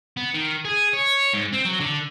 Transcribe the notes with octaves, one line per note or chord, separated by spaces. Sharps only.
B3
D#3
G#4
C#5
G#2
C4
F#3
D3